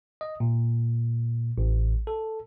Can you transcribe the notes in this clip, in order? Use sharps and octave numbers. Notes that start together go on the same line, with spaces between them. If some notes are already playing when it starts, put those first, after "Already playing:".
D#5
A#2
A1
A4